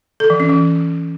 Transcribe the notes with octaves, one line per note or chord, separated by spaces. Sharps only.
A4
E3
C#4
E3